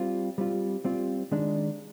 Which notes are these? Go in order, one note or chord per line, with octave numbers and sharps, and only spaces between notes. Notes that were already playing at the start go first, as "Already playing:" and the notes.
Already playing: G3 C4 F4
G3 C4 F4
G3 C4 F4
D#3 G#3 D4